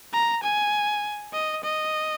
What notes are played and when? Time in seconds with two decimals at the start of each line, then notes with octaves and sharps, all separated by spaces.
0.13 A#5
0.44 G#5
1.33 D#5
1.64 D#5